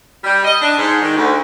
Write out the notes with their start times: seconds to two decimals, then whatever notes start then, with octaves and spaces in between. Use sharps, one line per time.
0.23 G3
0.44 D#5
0.61 D4
0.79 G#2
1.02 D#3
1.16 D2